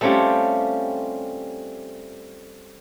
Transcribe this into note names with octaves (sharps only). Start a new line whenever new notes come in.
G3 A3 C4 C#4 F4 G4